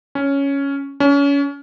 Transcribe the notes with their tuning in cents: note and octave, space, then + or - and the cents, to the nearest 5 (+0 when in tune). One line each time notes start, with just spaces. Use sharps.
C#4 +5
C#4 +30